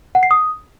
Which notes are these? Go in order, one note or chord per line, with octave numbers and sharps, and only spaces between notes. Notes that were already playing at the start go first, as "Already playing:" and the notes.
F#5
C7
D#6